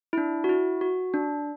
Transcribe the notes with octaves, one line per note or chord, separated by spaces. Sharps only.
E4
D4
F#4
E4
F#4
D4